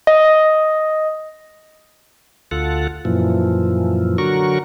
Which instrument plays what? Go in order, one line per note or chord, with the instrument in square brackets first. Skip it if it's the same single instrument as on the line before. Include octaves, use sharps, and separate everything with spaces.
[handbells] D#5
[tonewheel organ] D2 F4 A4 F#5
F#2 A#2 E3 F3
D3 F#3 F#4 A#4 C#6